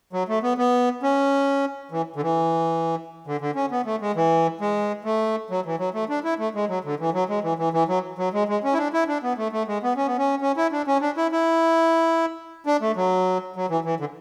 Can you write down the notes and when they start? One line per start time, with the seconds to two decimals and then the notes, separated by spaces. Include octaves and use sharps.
0.13 F#3
0.28 A3
0.43 B3
0.58 B3
1.03 C#4
1.91 E3
2.16 D3
2.22 E3
3.27 D3
3.41 D3
3.55 C#4
3.71 B3
3.86 A3
4.01 G#3
4.16 E3
4.61 G#3
5.05 A3
5.50 F#3
5.65 E3
5.79 F#3
5.94 A3
6.09 D4
6.24 E4
6.39 A3
6.55 G#3
6.69 F#3
6.84 D3
7.00 E3
7.14 F#3
7.29 G#3
7.43 E3
7.59 E3
7.73 E3
7.88 F#3
8.18 F#3
8.33 G#3
8.49 G#3
8.64 C#4
8.73 E4
8.78 D4
8.93 E4
9.08 D4
9.23 B3
9.37 A3
9.53 A3
9.68 G#3
9.83 B3
9.97 C#4
10.07 B3
10.18 C#4
10.42 C#4
10.57 E4
10.72 D4
10.87 C#4
11.01 D4
11.17 E4
11.32 E4
12.66 D4
12.81 A3
12.96 F#3
13.56 F#3
13.70 E3
13.84 E3
14.00 D3